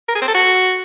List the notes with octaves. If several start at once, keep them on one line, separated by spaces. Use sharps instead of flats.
A#4
G#4
C4
A4
F#4